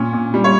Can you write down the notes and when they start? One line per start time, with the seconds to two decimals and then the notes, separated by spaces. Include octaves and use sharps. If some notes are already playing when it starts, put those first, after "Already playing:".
Already playing: A#2 C#4
0.13 A#2
0.34 G3
0.44 C#5